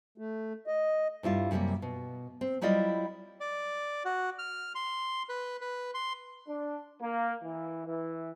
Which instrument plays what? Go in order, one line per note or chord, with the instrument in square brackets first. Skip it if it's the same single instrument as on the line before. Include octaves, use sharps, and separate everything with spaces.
[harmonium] A3
D#5
[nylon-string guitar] G2 G3 E4 F4
F#2 C3 E3 G3 A#3
B2
C4
F#3 G3 E4 F4 D5 D#5
[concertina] D5
F#4
F6
C6
B4
B4
C6
[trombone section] D4
A#3
E3
E3